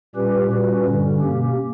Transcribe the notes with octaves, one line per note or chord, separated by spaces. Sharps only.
A#2 G3 C#4 G4 B4
A#2 G3 C#4 F#4 B4
G2 D3 G3 C#4
B2 A#3 C#4 G4